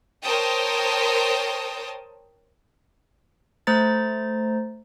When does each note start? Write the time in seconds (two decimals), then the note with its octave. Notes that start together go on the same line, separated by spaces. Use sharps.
0.23 A#4 C5 C#5 G5 A5 D#6
3.67 A3 C5 A#5 A6